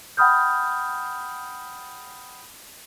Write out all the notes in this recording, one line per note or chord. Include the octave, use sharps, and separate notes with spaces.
F#5 G5 B5 D#6 F6 G6